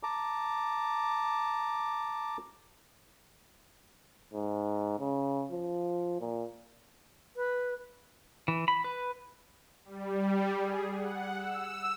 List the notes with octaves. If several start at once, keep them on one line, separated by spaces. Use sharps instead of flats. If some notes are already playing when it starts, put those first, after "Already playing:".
A5 A#5 D6
G#2
C#3
F3
A#2
B4
E3
B5
B4
G3
G#4
F#5
E6